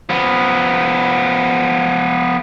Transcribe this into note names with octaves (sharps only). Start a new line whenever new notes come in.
F3 B3